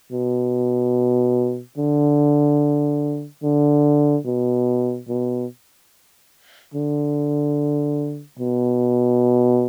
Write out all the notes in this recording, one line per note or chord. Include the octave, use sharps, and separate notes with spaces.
B2
D3
D3
B2
B2
D3
B2